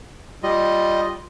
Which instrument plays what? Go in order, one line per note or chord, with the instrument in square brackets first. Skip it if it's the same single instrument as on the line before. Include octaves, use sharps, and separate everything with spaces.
[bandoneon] G3 D#5 [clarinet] F4